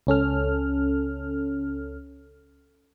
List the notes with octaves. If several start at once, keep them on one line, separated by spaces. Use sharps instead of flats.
C#2 C#4 A4 F6